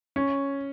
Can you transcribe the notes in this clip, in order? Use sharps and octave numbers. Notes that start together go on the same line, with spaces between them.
C#4